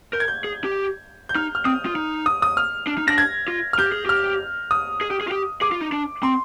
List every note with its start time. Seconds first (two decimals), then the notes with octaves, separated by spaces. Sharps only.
0.13 A#4 G6
0.20 G#6
0.28 G6
0.44 G#4
0.64 G4
1.29 G6
1.35 D#4 F6
1.55 F6
1.65 C4 D#6
1.86 F4
1.95 D#4
2.26 D#6
2.42 D#6
2.57 F6
2.87 D4
2.98 D#4
3.08 D4 A#6
3.18 G#6
3.48 F4
3.73 F6
3.79 G4 G6
3.92 G#4
4.06 G4 F6
4.71 D#6
5.01 G#4
5.11 G4
5.21 G#4
5.28 F4
5.31 G4
5.61 G#4 D6
5.72 F4
5.81 D#4
5.92 D4
6.23 C4 C6